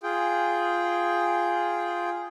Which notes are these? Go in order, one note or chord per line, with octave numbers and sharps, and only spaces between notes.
F4 G#4 G5